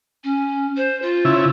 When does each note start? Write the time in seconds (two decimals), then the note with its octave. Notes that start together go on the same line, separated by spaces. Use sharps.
0.24 C#4
0.77 C5
1.02 F4
1.25 C#3 E4